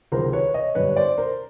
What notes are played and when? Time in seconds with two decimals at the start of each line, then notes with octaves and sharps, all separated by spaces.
0.12 C#2 C3 D#3 F#3 A#4 C5
0.33 B4 C#5
0.54 C#5 D#5
0.75 G1 F#2 D3 G3 B4 C#5
0.96 C5 D5
1.18 A#4 C5